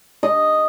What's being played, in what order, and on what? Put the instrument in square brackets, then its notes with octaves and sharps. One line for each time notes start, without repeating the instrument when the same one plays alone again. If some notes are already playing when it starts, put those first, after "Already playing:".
[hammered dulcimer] D#5